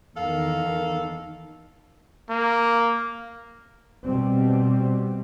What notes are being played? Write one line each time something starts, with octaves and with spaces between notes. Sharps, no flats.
E2 D#3 A#3 A4 F5
A#3
B2 G3 C4